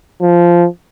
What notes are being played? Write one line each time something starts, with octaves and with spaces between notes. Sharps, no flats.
F3